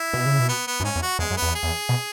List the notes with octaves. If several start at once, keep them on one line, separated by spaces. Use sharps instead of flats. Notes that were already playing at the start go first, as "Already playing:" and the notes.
Already playing: E4
B2
C#3
B2
B3
B3
F#2
G#2 C#4
E2
F#4
E2 G#3
F#2
B3
E2
G#4
E2
B2